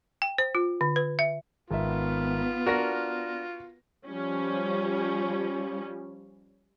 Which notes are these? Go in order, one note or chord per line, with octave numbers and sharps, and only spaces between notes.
G5
C5
F4
D3
B4
E5
G#1 B3 F4 E5
D4 F#4 A#4 A#6
F3 G3 C#4